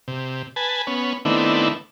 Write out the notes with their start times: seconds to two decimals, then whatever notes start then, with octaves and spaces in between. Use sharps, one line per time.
0.08 C3
0.56 B4 G#5 A5
0.87 B3 C#4
1.25 D#3 A3 B3 C4 D4 E4